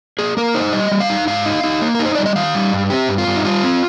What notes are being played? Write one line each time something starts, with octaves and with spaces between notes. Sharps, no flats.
A#3 G#4
A#3 A#4
D#4 C5
G3 D#5
G3
F5
D#4
G#2 F5
D#4
D#4
A#3
D#4 A#4
C5
G3 D5
D#5
D#3 F5
G3
G2
C4 G4
G2
F4
G2
D#4
G3 F4
C4